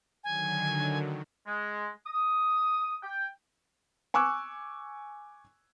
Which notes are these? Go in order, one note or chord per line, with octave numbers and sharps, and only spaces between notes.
D3 D#3 F#3 G#5
G#3
D#6
G5
G#5 C#6 D6 E6 F#6